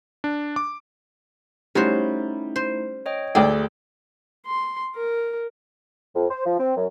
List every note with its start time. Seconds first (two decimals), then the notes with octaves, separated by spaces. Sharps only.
0.24 D4
0.56 D6
1.75 G3 A3 C#4 D#4 E4 F#4 C5
2.56 C5
3.06 C#5 D#5 G5
3.35 D2 G#4 A4 D5 G5
4.46 C6
4.95 A#4
6.16 F2
6.30 C5
6.46 F3
6.60 C4
6.77 F#2